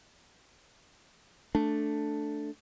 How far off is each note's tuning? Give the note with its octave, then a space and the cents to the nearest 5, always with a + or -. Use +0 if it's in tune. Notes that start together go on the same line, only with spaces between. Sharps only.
A3 +0 D4 +0